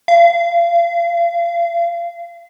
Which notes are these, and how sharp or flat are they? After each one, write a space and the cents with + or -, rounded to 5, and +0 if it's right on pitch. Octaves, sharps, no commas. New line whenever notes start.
F5 -30